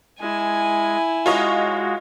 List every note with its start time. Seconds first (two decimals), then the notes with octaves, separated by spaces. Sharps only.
0.20 G#3 E4 G#5
1.26 G#3 F4 F#4 C#5 D#5